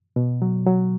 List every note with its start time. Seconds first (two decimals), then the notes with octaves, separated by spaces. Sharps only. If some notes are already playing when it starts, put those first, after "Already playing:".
0.16 B2
0.42 F#3
0.66 F#3